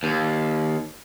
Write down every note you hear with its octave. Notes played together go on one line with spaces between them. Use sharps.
D#2